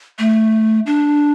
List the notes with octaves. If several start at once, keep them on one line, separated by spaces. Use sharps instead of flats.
A3
D4